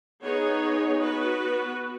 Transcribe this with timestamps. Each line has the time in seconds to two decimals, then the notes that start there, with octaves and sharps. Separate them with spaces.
0.23 B3 D#4 G#4 C#5
1.00 B3 F#4 B4